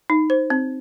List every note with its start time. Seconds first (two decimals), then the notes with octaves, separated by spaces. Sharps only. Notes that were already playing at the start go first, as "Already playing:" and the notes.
0.10 D#4
0.30 C5
0.50 C4